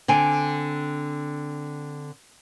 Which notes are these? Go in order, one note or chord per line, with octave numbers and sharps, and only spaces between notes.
D3 C4 G#5